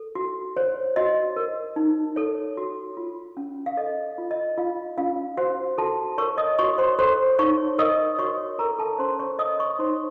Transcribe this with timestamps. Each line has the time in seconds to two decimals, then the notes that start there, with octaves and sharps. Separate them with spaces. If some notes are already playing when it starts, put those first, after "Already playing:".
Already playing: A4
0.15 F#4
0.57 C5 C#5
0.96 F#4 D#5
1.36 A#4
1.76 D#4
2.16 A4 C#5
2.57 F#4
2.97 F4
3.37 C#4
3.66 F5
3.77 A4 D#5
4.18 F4
4.31 D#5
4.58 F4 F5
4.97 C#4 F4 F5
5.37 F#4 C5 F#5
5.78 F#4 A4 A5
6.18 A#4 C#5 C#6
6.38 D#5 D#6
6.59 F#4 C#5 C#6
6.78 C5 C6
6.99 A4 C5 C6
7.39 D#4 C#5 C#6
7.78 A#4 D#5 D#6
8.18 F#4 C#5 C#6
8.58 A4 A#4 A#5
8.79 A4 A5
8.98 C#4 C5 C6
9.19 C#5 C#6
9.39 A4 D#5 D#6
9.59 C#5 C#6
9.79 D#4 C5 C6